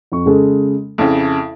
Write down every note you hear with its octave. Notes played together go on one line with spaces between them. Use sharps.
F2 C#6
C#3 G#3 A4
F2 C#3 E4